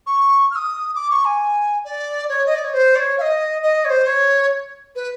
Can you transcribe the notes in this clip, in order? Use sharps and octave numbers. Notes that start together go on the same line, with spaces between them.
C#6
F6
D#6
D6
C#6
G#5
D5
C#5
D#5
D5
C#5
C5
D5
C#5
F5
D#5
D#5
C#5
C5
C#5
B4